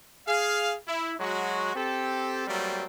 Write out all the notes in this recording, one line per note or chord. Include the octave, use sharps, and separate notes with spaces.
G#4 F5
E4
F#3 G#3 F#4
C4 G4 A4
F#3 G3 A3 A#3 C4